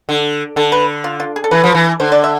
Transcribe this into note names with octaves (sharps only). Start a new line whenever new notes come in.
D3
D3 A4
B4
F4
F4
G#4
A4
E3 B4
F3
E3
D3 C5
D5
E5